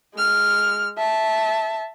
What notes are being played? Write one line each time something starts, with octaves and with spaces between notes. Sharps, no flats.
G#3 F6
E5 A5